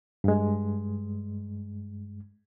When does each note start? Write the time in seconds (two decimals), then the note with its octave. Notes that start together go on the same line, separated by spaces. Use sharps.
0.24 G2 G#3